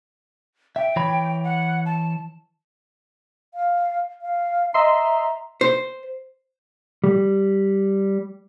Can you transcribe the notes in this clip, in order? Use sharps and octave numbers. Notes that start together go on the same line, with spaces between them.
E5 G5
E3 C#5 B5
F#5
A5
F5
F5
D#5 E5 A#5 C6
C5
G3